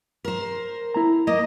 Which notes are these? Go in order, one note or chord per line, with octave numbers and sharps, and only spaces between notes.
A#4 C5
E4 A#5
A#3 D#5